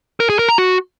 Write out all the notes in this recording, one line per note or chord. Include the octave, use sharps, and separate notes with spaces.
A#4
G#4
A#4
A#5
F#4